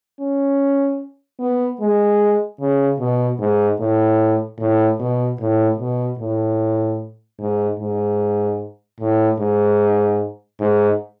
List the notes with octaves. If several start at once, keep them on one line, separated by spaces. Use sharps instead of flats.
C#4
B3
G#3
C#3
B2
G#2
A2
A2
B2
A2
B2
A2
G#2
G#2
A2
G#2
G#2